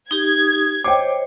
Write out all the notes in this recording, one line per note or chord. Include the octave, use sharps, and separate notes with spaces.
D#4 G4 D#6 G#6
C5 C#5 D#5 G5 D6